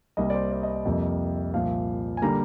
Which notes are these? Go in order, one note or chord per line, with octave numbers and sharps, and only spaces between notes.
C2 C3 G3 A#3 D#5
D5
C5
D5
D#5
D#5
F2 C3 G3 A#3
C2 A#2 F3 F5
G#5
D3 G3 A#3 A#5